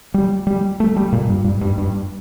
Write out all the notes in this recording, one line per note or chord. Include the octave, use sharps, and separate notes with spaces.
G3
G3
A3
G3
A#2
G2
G2
G2
G2